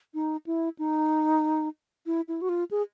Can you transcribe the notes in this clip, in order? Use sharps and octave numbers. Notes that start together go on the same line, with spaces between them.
D#4
E4
D#4
E4
E4
F#4
F4
G#4